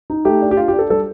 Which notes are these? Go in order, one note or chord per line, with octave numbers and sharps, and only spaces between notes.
D#4
A3 G4
D4
G4
D4 F4
G4
D4
A4
G3 A4